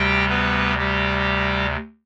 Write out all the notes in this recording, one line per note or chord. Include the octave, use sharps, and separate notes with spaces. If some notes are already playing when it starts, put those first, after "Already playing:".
Already playing: D2 C3 G3 G4 G5
B3 B4
G3 G4